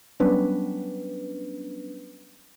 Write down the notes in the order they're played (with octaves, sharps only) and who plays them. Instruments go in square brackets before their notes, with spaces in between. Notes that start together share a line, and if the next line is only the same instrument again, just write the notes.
[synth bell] F#3 G3 B3 C#4 D4 B4